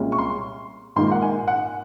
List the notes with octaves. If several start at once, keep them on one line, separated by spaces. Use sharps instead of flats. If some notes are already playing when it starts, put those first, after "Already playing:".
Already playing: C2 A#2 G#3 C#4
C#6
C6
A#1 G#2 D#3 A#3 C6
F#5
G#5
F#5